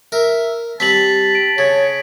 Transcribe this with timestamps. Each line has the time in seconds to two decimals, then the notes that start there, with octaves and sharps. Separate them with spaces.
0.12 A#4 E5
0.80 G3 C4 A5 B6 F#7
1.35 D7
1.58 C#3 C#5